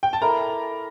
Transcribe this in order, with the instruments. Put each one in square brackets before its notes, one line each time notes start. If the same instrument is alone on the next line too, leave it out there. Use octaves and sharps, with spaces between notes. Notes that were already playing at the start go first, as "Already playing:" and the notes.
[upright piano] G5
A5
[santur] E4 A4 D5 F5 [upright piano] A#4 A#5